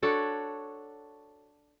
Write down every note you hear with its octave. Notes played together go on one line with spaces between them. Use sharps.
D4 F#4 A4 C#5